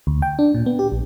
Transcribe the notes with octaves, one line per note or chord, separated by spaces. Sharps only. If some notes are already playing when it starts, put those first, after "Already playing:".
D2
G5
D4
A#2
B3
G4
A#1